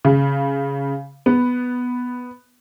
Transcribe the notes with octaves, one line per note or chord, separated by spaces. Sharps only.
C#3
B3